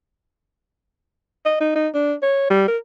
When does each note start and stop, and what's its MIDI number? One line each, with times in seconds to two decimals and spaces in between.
1.45 1.57 75
1.60 1.71 63
1.76 1.88 63
1.94 2.14 62
2.23 2.46 73
2.50 2.67 55
2.68 2.78 70